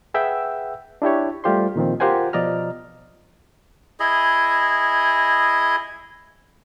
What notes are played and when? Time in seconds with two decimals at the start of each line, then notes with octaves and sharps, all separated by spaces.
0.14 G#4 B4 E5 F#5 G5 E6
1.02 D4 E4 G4 C#5
1.44 G3 A3 F4 G4 C5 C6
1.76 A#2 D#3 F3 C4
2.00 F4 G4 A#4 C5 F#5 G#5
2.33 B2 F3 D5 D#5 A#5 F6
4.00 E4 G#4 D#5